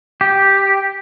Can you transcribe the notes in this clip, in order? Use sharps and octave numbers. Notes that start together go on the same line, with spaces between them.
G4